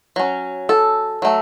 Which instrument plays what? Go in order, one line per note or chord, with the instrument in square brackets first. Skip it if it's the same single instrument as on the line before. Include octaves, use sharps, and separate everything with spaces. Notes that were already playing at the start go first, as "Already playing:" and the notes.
[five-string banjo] F#3 C#4
A4
F#3 A3